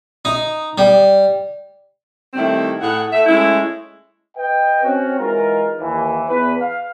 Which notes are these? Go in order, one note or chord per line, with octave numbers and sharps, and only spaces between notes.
D#4
G3
D#3 G3 A3 C4 E4
A2 G#4 F#5
A3 E5
G#3 A3 C#4 E4
B4 D#5 G5
C4 C#4 F#4
E3 G#3 D#4 F4 A#4
D#2 E3
E2 B4
F5